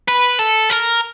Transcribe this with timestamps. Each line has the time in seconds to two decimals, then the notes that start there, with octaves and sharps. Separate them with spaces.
0.08 B4
0.39 A4
0.70 A#4